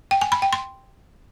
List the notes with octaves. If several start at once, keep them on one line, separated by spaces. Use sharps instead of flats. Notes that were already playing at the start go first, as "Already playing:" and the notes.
G5
G#5
B5
G5
C6